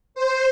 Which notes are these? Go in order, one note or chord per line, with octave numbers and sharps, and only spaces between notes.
C5